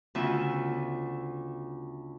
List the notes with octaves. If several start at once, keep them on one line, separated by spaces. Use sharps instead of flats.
D2 C#3 B3 F4 E5